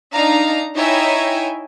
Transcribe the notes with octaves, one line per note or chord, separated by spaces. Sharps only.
D4 D#4 F5 A#5
D#4 E4 C#5 E5 G5 G#5